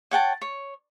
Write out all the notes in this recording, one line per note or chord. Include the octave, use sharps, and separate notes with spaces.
C#5 F#5 G5 A5
C#5